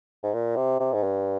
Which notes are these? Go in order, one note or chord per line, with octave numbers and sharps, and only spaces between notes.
G#2
A#2
C3
C3
G#2
G2